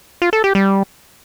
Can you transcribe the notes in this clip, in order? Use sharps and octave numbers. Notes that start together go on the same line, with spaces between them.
F4
A4
G4
G3